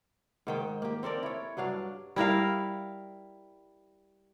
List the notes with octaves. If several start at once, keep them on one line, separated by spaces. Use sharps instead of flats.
G#2 D#3 G5
A#3 G4
C4 A4 A#4 D5
E4 C#5
G2 F#3 D4 F5
G3 E4 A#4 F5